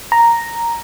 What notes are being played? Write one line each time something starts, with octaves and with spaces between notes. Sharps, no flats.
A#5